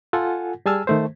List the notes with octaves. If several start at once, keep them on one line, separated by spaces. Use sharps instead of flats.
F4 A4 F#5 G#5
G3 G#4 G#5 A5 E6 F6
D#3 A3 C5